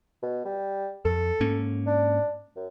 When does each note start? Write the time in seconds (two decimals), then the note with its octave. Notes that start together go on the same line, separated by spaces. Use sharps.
0.23 B2
0.45 G3
1.05 F2 A4
1.40 G#2 A#3 C#4
1.87 D4
2.56 F#2